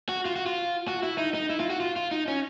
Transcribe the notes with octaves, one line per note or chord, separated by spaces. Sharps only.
F#4
F4
F#4
F4
F#4
E4
D#4
D#4
E4
F4
F#4
F4
F4
D#4
C#4